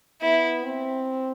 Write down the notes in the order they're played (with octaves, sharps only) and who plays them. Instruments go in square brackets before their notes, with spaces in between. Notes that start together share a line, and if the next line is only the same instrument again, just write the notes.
[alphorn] B3 [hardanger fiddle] E4
[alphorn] C4